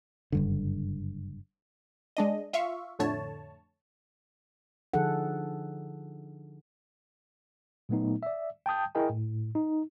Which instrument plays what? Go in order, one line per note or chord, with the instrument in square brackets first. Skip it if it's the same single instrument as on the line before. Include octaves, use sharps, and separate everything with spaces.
[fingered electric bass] F#1 G2 D3
[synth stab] G#3 D4 D#5
F4 E5 F5 C#6
F2 A2 D3 A3 C#5 A5
[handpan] D3 F3 D#4 G#4 A4 F#5
[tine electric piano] A#2 F#3 A3 B3 D#4
D5 E5
G5 A5 D#6 G6
E4 G#4 A#4 D#5 G5 G#5
A2
D#4